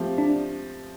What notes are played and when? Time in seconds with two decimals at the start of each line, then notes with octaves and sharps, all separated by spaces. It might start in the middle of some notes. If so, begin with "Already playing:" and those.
Already playing: F3 A3 C4 G4
0.18 D4